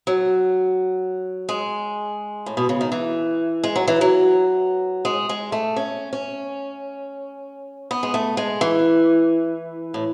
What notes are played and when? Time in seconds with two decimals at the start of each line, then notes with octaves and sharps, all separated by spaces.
0.07 F#3
1.49 G#3
2.46 A2
2.57 B2
2.69 C#3
2.81 D#3
2.92 E3
3.63 G#3
3.76 F#3
3.87 E3
4.01 F#3
5.05 G#3
5.29 G#3
5.52 A3
5.76 C#4
6.13 C#4
7.91 B3
8.03 G#3
8.14 A3
8.37 G#3
8.61 E3
9.94 A2